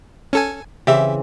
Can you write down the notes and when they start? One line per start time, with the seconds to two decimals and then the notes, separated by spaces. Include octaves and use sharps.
0.33 C#4 A4 G#5
0.87 C#3 E3 C4 G4 E5